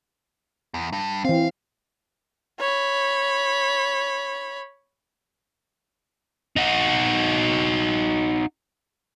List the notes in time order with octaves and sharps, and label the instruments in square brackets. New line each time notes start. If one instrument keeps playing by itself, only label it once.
[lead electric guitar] E2
G2
[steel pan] E3 C4 [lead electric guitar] F5
[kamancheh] C#5 B5
[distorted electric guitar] D#4 F#4